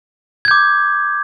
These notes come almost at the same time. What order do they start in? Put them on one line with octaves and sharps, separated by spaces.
G#6 G6 D6